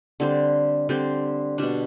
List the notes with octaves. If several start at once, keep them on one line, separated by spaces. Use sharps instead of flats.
D3 G3 C4 G4
D3 G3 C4 G4
B2 G3 D4